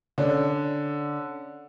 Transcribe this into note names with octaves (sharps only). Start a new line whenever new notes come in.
D3 C#4